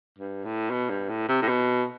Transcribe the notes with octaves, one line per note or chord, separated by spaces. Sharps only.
G2
A2
B2
G2
A2
C3
A2
B2